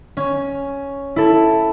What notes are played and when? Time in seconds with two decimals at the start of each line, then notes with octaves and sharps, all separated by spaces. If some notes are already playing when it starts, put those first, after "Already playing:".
0.17 C#4
1.16 E4 A4